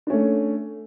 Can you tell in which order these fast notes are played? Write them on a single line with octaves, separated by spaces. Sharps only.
D4 C#4 A3